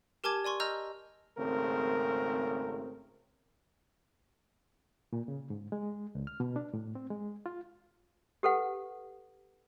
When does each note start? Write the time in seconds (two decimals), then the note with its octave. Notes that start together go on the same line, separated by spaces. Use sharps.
0.24 G4 A#4 G#5 A5 D6 G#6
0.45 D5 G#5 C6 C#6
0.60 D#5 A#5 E6 F6 G6
1.37 G#1 C#3 A3 C4 A#4
5.13 A#2
5.28 C#3
5.50 G#2
5.72 G#3
6.15 C#2
6.27 F6
6.40 B2
6.56 D4
6.74 A2
6.95 C4
7.10 G#3
7.46 F4
8.43 G4 A4 B4 F#5